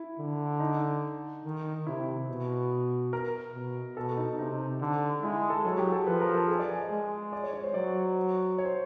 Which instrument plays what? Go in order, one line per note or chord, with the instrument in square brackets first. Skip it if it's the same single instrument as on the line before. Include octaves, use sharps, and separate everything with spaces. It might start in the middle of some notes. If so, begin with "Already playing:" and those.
Already playing: [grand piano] E4
[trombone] D3
[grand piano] D#4
[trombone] D#3
[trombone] C3 [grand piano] E4
[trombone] B2
[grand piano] A#4
[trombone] B2
[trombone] B2 [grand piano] A4
[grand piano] D#4
[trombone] C3 [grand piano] D#4
[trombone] D3
[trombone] G#3 [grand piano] E4
[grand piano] A4
[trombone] F#3 [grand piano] G#4
[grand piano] G4
A4
[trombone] F3 [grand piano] B4
[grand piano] A#4
A4
G#4
D5
G#5
D#5
[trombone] G#3
[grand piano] D5
C#5
C#5
C5
[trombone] F#3 [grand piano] D5
[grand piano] C#5
C5